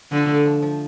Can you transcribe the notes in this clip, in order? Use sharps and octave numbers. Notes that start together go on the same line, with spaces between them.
D3 F3
A3
F3
F3